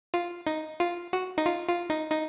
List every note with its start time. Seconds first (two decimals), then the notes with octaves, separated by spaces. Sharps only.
0.14 F4
0.47 D#4
0.80 F4
1.13 F#4
1.38 D#4
1.46 F4
1.68 F4
1.90 D#4
2.12 D#4